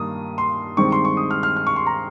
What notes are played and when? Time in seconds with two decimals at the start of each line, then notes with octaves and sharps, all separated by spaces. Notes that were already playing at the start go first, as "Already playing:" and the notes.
Already playing: G2 D#3 A#3 D#6
0.38 C6
0.77 G2 D#3 G#3 C4 C#6
0.92 C6
1.05 C#6
1.17 D#6
1.31 F6
1.43 F6
1.56 F6
1.67 C#6
1.76 C6
1.87 A#5